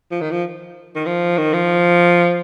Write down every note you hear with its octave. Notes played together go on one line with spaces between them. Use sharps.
F3
D#3
F3
D#3
F3
D#3
F3